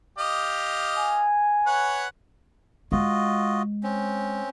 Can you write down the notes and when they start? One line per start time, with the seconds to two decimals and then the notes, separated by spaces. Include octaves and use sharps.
0.18 G4 D#5 F5
0.98 G#5
1.66 B4 C#5 F#5
2.92 G#3 F4 F#4 D#5
3.83 C4 C#4